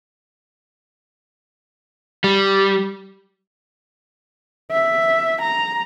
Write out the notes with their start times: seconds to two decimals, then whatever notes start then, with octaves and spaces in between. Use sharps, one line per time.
2.24 G3
4.72 E5
5.41 A#5